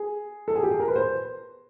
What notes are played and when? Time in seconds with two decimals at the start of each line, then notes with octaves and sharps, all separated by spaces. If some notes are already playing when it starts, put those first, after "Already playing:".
Already playing: G#4
0.48 A4
0.56 G#4
0.63 G4
0.71 G#4
0.80 A#4
0.88 B4
0.96 C5